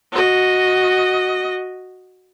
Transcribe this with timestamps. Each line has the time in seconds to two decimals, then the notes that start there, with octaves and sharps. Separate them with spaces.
0.12 F#4 D#5